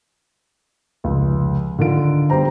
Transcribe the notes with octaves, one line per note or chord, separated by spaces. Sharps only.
F1 C#2
D3 D#3 F4 D7
G3 B3 G4 C5 A#5